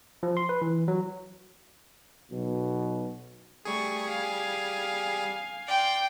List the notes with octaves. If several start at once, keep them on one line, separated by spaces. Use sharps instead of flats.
F3
C6
B4
E3
F#3
B1 B2
G3 A3 G#4 C#6
F5 G#5
D5 G5 C6